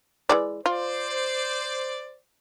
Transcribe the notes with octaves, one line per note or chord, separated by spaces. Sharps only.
E3 G#3 D5
F4 C5 D5